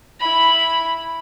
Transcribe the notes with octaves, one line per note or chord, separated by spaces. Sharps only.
E4 B5